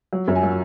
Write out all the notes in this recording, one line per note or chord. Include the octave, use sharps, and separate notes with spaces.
F#3
F#2
G#5
F#3